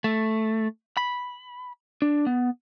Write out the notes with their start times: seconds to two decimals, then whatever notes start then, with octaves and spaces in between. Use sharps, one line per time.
0.04 A3
0.97 B5
2.02 D4
2.27 B3